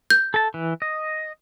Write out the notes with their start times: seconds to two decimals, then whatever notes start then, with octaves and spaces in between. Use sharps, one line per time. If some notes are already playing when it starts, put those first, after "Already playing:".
0.10 G6
0.34 A4 A5
0.54 E3
0.82 D#5